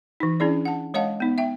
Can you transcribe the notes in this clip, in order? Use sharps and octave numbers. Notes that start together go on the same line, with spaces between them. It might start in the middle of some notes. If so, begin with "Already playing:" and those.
E3 D#4
C#4 D4 E4 G#4 D5
F#5 A5
G#3 C#5 D#5 F5 F#5 A5
B3 D#4
E5 G5